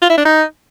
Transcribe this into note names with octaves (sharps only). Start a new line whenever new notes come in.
F4
E4
D4
D#4